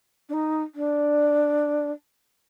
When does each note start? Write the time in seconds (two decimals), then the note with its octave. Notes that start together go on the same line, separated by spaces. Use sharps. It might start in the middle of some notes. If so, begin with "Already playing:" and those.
0.29 D4
0.33 D#4
0.75 D4